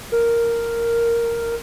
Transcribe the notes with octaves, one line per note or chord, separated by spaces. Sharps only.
A#4